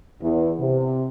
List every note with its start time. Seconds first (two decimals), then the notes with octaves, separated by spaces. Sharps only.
0.21 E2
0.60 C3